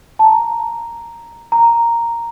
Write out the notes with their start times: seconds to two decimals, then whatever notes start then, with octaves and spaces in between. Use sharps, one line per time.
0.19 A5
0.24 A#5
1.52 A#5